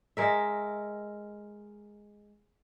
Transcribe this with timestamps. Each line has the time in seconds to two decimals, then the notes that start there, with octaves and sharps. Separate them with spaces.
0.17 G#3 A#4 E5